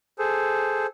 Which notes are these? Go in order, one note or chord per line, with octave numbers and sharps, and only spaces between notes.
G#4 A4 C5